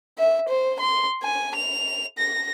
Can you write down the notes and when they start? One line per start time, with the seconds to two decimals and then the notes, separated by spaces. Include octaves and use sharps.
0.18 E5
0.49 C5
0.80 C6
1.23 G#5
1.56 F7
2.18 A#6